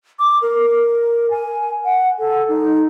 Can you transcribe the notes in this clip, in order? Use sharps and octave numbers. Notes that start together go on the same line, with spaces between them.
D6
A#4
G#5
F#5
A4
D#4